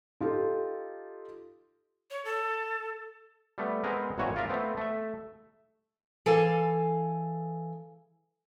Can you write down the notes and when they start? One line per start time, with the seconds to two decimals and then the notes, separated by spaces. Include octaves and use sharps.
0.20 D#4 F4 G4 A4
2.10 C#5
2.25 A4
3.58 G3 A3 B3
3.84 G#3 B3 C4 G#4 A#4
4.18 G#1 A#2 E3 F#4 C#5 G#5
4.36 F4 A#4 D5 E5 F5
4.49 A3 B3 C4
4.77 A3 E5
6.26 E3 G#4 A4 F5 G#5